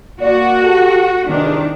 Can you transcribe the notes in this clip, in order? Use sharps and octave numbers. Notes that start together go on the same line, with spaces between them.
A#3 F#4 D5
G4 A4
G#2 C3 D#3 E3 D4